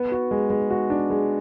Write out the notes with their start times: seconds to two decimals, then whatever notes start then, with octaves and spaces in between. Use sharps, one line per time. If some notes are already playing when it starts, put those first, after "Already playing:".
Already playing: B3
0.12 F#4
0.31 G#3
0.50 G#3
0.70 F#4
0.90 D4
1.10 G#3